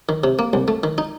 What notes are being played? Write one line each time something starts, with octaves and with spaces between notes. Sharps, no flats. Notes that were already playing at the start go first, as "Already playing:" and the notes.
D#3
C3
A#3
C2
A3
D#3
D#4